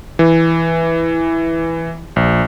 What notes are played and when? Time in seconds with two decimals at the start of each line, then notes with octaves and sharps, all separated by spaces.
0.19 E3
2.16 A#1